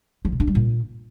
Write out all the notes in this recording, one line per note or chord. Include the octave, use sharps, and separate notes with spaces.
F3
B2
D4
G3
A#2